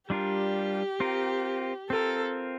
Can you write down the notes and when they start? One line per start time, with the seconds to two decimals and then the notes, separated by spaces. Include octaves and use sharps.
0.10 G3 D4 F4 G4 A#4
1.00 C4 F4 A#4
1.90 C4 F4 A4 A#4